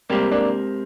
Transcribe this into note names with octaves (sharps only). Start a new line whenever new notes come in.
G3 G#3 A#3 C4 G4 A#4
A#3 D4